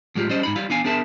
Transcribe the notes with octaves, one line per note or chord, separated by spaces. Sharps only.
A2 F#3 G#3 F4 G4
G3 C#4 C5 D#5
G#2 D#4 B5
G3 E4 F5
B3 D4 F5 G#5
B3 D4 G#4 A#4 E5 A5